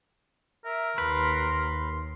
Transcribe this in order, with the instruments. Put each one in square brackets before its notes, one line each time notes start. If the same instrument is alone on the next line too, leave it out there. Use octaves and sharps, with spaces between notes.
[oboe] A#4 [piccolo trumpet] E5
[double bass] D#2 [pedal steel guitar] B4 [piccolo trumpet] C6